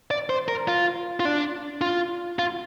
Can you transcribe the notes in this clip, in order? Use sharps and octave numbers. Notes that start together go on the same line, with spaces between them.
D5
C5
A#4
F4
F4
D4
F4
F4